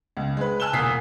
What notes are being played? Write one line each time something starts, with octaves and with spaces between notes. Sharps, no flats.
C#2
G#3 B4
G#5 A5 E6 F#6 E7 G7
E1 A#2 G#5 D#6 B6 C7